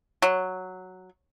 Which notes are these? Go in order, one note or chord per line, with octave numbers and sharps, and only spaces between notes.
F#3